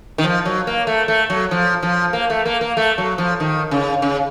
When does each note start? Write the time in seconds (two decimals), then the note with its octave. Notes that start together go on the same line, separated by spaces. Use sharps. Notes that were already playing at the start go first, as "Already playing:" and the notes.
0.18 D#3
0.24 F3
0.45 F#3
0.67 A#3
0.87 A3
1.08 A3
1.30 F#3
1.51 F3
1.83 F3
2.13 A#3
2.30 A3
2.46 A#3
2.61 A#3
2.77 A3
2.98 F#3
3.18 F3
3.40 D#3
3.71 C#3
4.02 C#3